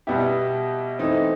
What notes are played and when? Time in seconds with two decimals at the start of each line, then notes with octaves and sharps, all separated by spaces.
0.07 B2 G3 B3 E4 G4
0.99 E3 A3 C4 D#4